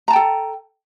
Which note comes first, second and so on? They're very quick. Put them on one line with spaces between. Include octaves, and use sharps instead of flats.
A#5 A5 G5 A4